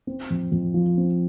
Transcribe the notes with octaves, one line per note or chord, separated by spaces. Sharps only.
C4
F2
F2
F3
C4